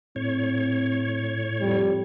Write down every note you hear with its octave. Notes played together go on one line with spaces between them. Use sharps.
A2 C4 C#5
F2 G3